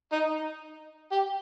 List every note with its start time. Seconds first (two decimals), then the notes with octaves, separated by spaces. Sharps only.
0.12 D#4
1.12 G4